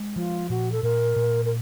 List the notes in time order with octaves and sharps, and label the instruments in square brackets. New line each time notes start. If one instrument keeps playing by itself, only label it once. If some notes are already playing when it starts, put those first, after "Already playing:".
Already playing: [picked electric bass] G#3
[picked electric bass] F3 [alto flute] F4
[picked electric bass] A#2 [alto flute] F#4
[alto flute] A4
[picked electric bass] A#2 [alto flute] A#4
[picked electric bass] A#2
[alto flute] A#4